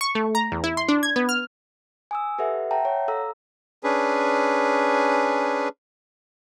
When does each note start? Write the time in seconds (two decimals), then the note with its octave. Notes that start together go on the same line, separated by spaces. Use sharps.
0.01 C#6
0.15 A3
0.35 A#5
0.52 E2
0.64 E4
0.77 C6
0.89 D4
1.03 G#6
1.16 B3
1.29 F6
2.11 G#5 D#6 E6
2.38 G4 A4 B4 E5 F#5
2.71 E5 F#5 G5 A5 A#5
2.85 C#5 F#5
3.08 A4 F5 A#5 E6
3.84 C#4 D4 G#4 B4